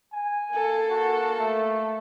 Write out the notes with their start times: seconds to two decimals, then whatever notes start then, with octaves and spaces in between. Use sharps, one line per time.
0.13 G#5
0.52 A#3 A4
0.90 F#4
1.39 A3